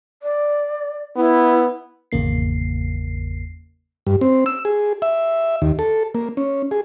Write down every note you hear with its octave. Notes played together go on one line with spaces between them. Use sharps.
D5
B3 E4
G#1 E2 C#3 A#3 C7
G2
C4
E6
G#4
E5
D#2
A4
A#3
C#4
G#4